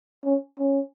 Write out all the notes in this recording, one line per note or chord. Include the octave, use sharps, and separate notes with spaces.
C#4
C#4